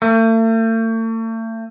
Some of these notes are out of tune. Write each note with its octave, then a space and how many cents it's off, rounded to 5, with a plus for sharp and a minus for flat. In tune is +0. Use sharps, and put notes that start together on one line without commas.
A3 +40